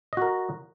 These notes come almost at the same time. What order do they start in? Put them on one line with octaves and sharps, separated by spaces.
D#5 F#4 A#4